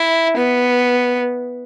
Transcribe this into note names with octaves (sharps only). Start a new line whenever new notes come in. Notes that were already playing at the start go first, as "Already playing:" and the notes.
Already playing: E4
B3